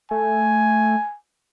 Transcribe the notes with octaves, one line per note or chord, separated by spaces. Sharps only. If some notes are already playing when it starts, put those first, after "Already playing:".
A3 G#5